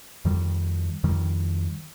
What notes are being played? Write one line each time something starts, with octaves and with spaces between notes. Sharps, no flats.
F2 D#3 G3
F2 D#3 G3